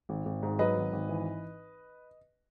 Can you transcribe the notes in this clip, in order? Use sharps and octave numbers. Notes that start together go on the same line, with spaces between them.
G#1
G#1
G#2
F#3 B4 D#5
G#1
G#1
E3